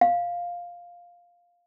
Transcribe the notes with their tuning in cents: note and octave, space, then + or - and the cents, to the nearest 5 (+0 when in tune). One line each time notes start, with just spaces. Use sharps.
F5 +5